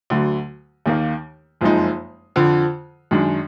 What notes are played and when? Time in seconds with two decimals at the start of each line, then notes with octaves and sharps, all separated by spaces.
0.10 D2 D3 F#3
0.86 D#2 D#3 A#3
1.61 F#1 F2 F3 G#3 D#4
2.36 F2 D3 F3
3.11 F#2 D#3 G#3 D4